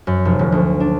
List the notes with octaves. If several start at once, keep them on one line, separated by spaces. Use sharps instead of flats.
F#2
F1
D#1
D2
D4